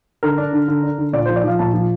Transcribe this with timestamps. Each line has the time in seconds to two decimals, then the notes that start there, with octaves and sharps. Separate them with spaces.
0.23 D3 A#4
0.38 D4
0.53 D3
0.68 D3
0.83 D4
0.98 D3
1.13 A#2 D5
1.26 F3 C5
1.36 D5
1.44 F3 F5
1.59 A#2 A5
1.74 F3